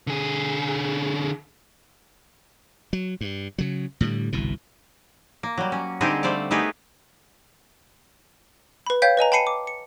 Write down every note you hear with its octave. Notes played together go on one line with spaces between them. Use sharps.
D3 G#4
F#3
G2
C#3 F#3
A2 D3 D#3 G3
G1 C2 B2 E3
A#3
F#3 G3
C#4
D3 G3 C4 D#4 G4 G#4
G3 A3 C5 D5 F5
A3 B3 D#4 G4 G#4 B4
B4 B5
C#5 F5 G5 G6 B6
B4 D#5 G#5 A#5
G5 A5 B5 C7 C#7 D#7
D6
C#7